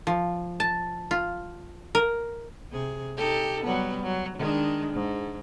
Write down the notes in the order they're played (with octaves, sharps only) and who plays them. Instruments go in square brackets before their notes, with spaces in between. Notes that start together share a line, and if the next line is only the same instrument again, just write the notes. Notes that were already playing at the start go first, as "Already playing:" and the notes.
[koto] F3
A5
F4
A#4
[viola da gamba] C3 G#4
D#4 G4 A4
F#3 G3 B3
F#3
D#3 G#3 D4
G#2